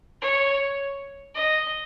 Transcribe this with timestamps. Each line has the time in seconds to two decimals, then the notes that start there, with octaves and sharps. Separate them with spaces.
0.21 C#5
1.34 D#5